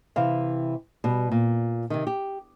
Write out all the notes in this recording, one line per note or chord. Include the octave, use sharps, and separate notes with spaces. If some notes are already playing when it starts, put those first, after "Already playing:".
C3 E3 F5
B2 G3
A#2
C3 D#3
G4